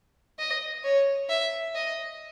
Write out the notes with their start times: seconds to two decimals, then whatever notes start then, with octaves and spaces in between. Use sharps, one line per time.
0.39 D#5
0.84 C#5
1.29 E5
1.75 D#5